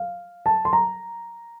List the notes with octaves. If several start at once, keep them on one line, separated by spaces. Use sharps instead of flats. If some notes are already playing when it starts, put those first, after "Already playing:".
Already playing: F5
A5
C6
A#5